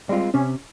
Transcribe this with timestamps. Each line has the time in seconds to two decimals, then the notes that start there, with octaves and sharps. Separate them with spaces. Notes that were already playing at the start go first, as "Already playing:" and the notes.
0.09 G3 G#3 C4 F4
0.34 C3 C#4